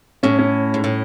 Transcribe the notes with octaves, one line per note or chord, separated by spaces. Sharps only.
A2 C#4
C#4
G#2
A2